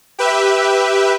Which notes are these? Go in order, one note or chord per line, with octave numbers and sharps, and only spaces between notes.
G4 B4 E5